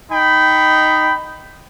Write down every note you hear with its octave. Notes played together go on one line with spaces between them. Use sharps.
D#4 G5 B5